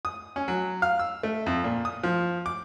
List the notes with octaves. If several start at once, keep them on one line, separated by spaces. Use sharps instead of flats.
D#6
C#4
F#3
F5
E6
A3
F2
A#2
D#6
F3
D6